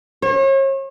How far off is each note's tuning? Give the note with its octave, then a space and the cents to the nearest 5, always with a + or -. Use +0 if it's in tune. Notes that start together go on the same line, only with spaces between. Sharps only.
C#5 -40